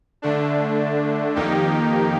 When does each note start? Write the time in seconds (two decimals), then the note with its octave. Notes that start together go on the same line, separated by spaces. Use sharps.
0.22 D3 A3 D4
1.35 F2 D#3 A#3 D#4 G4